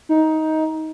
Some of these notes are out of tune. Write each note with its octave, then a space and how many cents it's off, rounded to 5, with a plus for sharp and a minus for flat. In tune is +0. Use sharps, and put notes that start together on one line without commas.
D#4 +15